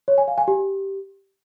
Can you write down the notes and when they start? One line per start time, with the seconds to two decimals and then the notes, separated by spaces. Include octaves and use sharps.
0.08 C#5
0.18 G#5
0.28 F5
0.38 G#5
0.48 G4